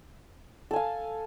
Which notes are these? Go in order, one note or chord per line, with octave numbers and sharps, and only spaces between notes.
A4 F5 G#5